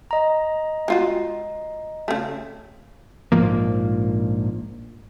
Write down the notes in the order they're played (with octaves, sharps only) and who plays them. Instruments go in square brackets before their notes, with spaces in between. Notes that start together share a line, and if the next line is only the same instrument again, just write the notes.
[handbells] D#5 A#5
[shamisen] G#3 F4 F#4
C#3 A3
[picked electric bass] A#1 G#2 F3 A#3